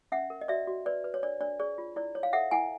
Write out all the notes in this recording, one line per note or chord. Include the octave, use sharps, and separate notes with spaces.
C#4 E5 F#5
A#4
D#5
F#4 D5 E5
F#4
B4 D5
B4
C#5
D4 D5
D4 D5
G#4 D5
F4
E4 D5
C#5
F5
A4 E5 F#5
E4 F#5 G#5